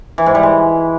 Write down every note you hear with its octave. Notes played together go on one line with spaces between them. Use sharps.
E3
G#2
G3
G#3